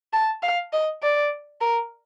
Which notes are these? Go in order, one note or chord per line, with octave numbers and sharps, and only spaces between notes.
A5
F5
D#5
D5
A#4